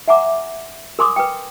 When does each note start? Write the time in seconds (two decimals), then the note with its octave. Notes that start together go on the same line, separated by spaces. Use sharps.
0.08 E5 F#5 G#5 A#5 D6
0.99 A#4 G#5 C6 D6 D#6
1.16 B4 G5